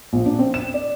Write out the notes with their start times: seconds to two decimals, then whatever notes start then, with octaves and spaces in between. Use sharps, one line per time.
0.13 A#1
0.26 D4
0.39 C4
0.54 E7
0.74 D5